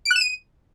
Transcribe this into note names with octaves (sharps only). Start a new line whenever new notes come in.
D7
F#6
E7
D#7